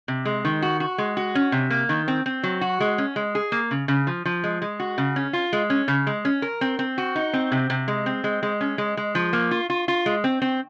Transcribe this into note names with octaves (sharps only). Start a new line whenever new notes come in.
C3
G#3
D#3
F#4
F#4
G#3
F#4
C#4
C3
A#3
D#3
C4
C4
F#3
F#4
G#3
C#4
G#3
G#4
A#3
C#3
C#3
F3
F3
G#3
G#3
F#4
C#3
C#4
F4
G#3
C#4
C#3
G#3
C#4
A#4
C4
C4
F#4
D#4
C4
C3
C3
G#3
C4
G#3
G#3
C#4
G#3
G#3
F3
A#3
F4
F4
F4
G#3
C4
C4